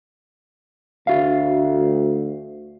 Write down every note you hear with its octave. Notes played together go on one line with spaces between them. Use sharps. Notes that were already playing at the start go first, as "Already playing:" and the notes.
D2 F#4 E5 F5